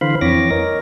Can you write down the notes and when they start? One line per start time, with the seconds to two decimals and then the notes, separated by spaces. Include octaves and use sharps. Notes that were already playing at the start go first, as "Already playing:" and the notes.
0.01 D3 E3 C5 F5 B5
0.21 F2 E3 C4 C#5 D6 A#6
0.51 A#4 C#5 D#5